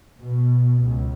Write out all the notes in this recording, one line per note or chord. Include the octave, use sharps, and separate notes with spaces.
B2
C#2